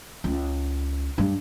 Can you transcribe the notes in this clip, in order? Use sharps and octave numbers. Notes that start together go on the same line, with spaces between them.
C#2
G2